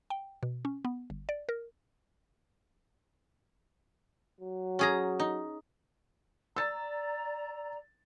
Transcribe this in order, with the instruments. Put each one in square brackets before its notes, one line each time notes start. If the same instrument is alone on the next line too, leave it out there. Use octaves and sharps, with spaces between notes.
[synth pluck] G5
B2
C#4
B3
G1
D5
A#4
[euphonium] F#3
[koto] C#4 G#4 A#5
D#4
[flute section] D5 A#5 [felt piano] E6 A6